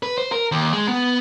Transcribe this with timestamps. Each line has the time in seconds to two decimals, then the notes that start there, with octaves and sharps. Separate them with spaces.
0.03 B4
0.18 C5
0.32 A#4
0.52 D#2
0.73 G#3
0.88 B3